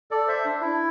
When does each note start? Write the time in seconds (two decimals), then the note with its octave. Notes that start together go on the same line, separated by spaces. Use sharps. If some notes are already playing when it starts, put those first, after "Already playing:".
0.11 A4 D5
0.28 C5 E5
0.45 D4
0.61 E4